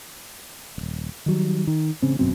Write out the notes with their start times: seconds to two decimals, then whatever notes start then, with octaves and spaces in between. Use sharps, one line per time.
0.78 D#1 G#1
1.26 D#3 F#3 G3
1.67 D#3
2.02 A1 C#3 C4
2.19 G#1 F#2 B2 C4